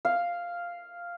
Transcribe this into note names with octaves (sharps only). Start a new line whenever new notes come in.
F5